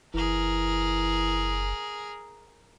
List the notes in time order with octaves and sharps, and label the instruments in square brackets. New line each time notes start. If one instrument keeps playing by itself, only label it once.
[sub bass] F#1 [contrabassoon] E3 [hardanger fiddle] G#4 A#4